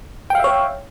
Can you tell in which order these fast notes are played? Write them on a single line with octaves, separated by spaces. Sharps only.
G5 F5 E5 C#5